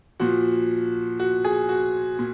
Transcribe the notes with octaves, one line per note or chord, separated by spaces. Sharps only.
A#2 F3 F#4
F#4
G#4
F#4
A#2